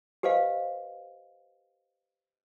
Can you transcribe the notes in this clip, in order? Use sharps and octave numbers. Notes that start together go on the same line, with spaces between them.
G4 B4 C5 D#5 F5